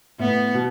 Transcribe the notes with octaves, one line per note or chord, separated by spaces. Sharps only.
A2 B3
B2